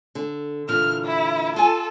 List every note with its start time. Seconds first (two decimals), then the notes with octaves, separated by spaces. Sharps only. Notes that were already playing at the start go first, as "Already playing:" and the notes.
0.15 D3
0.69 A#2 D3 E3 F6
1.05 E4
1.56 F4 A4 F#5 G#5